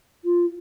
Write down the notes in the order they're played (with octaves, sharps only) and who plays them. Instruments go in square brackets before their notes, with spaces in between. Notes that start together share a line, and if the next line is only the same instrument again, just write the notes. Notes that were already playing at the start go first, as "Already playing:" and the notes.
[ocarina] F4